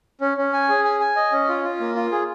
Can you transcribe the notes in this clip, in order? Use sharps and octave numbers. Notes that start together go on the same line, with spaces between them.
C#4
C#4
G#5
G#4
G#5
G#5
D#5
C#4
F4
F4
A#3
F4
G#4